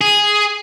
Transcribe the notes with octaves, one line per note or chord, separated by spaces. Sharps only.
G#4